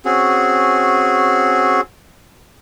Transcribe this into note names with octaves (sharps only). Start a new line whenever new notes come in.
C4 C#4 F#4 G#4